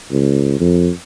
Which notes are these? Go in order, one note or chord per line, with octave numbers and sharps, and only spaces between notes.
C#2
F2